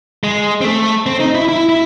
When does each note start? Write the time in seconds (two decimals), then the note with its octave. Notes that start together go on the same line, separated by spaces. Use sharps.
0.24 G#3
0.61 C4
0.65 A3
1.06 C4
1.20 D#4
1.35 E4
1.49 E4
1.69 E4